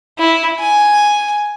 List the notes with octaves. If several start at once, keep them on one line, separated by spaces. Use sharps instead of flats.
E4
G#5